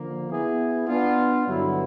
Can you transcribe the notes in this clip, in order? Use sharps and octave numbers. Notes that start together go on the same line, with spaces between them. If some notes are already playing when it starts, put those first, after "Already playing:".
Already playing: D3 F3 A#3
B3 E4 G#4
B3 D4 F4
G2 D3 F#3 B3 E4